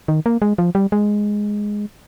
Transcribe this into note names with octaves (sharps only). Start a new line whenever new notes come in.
D#3
A#3
G#3
F3
G3
G#3